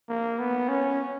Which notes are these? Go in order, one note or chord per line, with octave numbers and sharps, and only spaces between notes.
A#3
B3
C#4